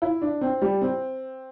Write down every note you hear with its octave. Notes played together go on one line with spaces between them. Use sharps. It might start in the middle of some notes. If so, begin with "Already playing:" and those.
E4
D4
C4
G3
C4